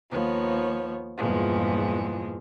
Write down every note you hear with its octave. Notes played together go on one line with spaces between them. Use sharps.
D#2 F3 B3 C#5
E2 G2 A#2 E3 F3 G#3